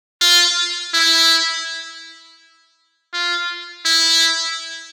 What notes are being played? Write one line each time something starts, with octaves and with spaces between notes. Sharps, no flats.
F4
E4
F4
E4